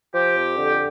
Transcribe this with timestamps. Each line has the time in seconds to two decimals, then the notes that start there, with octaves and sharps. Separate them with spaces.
0.14 F3 G4
0.36 F2
0.58 D3